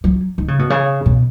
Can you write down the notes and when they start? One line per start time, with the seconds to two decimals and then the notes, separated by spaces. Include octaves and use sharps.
0.04 F#3
0.38 D#3
0.48 C#3
0.59 B2
0.70 C#3
1.06 B2